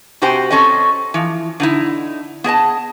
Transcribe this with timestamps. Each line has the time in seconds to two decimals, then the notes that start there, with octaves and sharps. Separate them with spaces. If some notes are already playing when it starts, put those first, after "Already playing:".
0.22 C3 F#4 G4 C5 G5 G#5
0.51 C4 C#4 A4 C#5 D#5
1.14 E3 F3
1.60 D3 D#4 E4
2.44 B3 G#4 D#5 A5